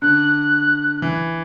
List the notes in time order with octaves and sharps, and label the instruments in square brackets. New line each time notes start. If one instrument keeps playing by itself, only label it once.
[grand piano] D3 [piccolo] F#6
[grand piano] E3